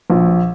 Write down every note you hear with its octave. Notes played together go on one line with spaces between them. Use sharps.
A#1